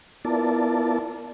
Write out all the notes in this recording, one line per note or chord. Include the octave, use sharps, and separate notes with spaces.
B3 E4 F4 A#4 D5 A5